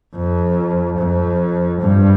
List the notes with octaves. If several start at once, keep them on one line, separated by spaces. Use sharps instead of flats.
F2
F2
G2